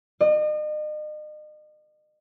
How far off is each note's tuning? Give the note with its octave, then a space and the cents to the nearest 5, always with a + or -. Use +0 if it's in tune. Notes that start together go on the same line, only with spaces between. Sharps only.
D#5 -40